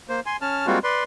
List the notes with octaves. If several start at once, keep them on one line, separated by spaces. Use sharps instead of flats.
A#3 C5
G#5 C6
C#4 A5 F6
G3 G#3 A#3 C4 F4 F#4
B4 D5 C6